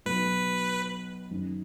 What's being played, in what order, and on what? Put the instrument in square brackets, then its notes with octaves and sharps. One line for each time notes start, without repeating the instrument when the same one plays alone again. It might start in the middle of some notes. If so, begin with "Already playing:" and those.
[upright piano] B1 B2 F#3 B3 [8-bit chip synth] B4
[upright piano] F#1 F#2 D#3